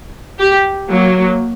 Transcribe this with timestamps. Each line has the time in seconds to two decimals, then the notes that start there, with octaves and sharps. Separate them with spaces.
0.39 G4
0.89 F#3 A#3